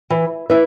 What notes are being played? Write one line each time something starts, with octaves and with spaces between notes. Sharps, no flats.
E3
E4 B4 E5